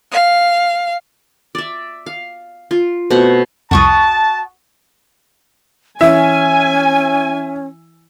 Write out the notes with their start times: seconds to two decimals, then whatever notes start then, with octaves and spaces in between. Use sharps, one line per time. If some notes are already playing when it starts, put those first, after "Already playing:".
0.12 F5
1.55 D5 E5
2.06 F5
2.71 F4
3.11 B2 A3 C4 F#5
3.71 C2 F2 F#4 A5 C#6 D#6
6.01 E3 C#4 E4 E5 G#5